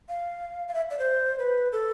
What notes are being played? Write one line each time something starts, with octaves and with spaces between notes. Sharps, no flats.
F5
F5
E5
D5
C5
B4
A4